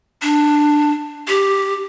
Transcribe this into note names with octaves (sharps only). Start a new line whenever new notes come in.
D4
G4